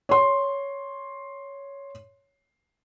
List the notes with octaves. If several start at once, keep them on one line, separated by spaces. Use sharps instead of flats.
C#5 C6